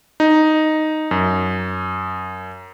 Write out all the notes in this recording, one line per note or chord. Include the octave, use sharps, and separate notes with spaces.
D#4
F#2